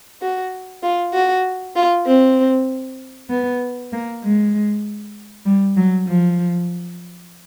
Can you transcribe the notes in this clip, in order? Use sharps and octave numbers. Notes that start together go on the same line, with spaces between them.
F#4
F4
F#4
F4
C4
B3
A#3
G#3
G3
F#3
F3